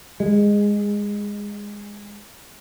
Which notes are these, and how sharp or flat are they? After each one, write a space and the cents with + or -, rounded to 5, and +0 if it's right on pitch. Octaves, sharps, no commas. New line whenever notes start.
G#3 -15